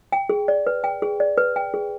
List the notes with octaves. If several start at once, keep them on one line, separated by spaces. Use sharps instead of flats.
G5
G#4
D5
B4
G5
G#4
D5
B4
G5
G#4